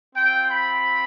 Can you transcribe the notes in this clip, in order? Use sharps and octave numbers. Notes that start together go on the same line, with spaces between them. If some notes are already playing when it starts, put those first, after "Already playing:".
C4 F4 G5
B5